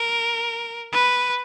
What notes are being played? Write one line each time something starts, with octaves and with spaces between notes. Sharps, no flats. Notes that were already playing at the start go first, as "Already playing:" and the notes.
Already playing: A#4
B4